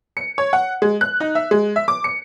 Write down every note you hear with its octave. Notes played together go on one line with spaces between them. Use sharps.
C#7
C#5
F#5
G#3
F#6
D#4
E5
G#3
E5
D6
C#7